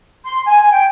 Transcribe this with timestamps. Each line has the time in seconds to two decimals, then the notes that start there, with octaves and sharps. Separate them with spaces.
0.24 C6
0.46 G#5
0.71 G5